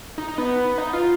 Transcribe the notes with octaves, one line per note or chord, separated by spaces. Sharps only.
D#4
D#4
B3
D#4
F4